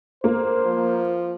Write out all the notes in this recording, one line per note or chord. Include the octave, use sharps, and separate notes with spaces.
A#3 C5
F3